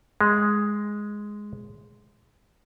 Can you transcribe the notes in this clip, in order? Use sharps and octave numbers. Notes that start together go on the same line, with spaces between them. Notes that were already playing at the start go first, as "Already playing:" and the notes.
G#3